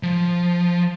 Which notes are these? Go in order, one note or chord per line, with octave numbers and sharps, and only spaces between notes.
F3